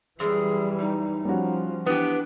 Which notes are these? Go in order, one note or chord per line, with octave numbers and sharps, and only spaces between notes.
F#2 E3 G3 G#4
D#4
F3 G3 C#4 F#4
E3 B3 D4 G4